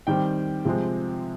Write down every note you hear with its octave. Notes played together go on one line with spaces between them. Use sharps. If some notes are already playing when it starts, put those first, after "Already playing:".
D#3 G3 C4 G5
C3 F3 G#3 C4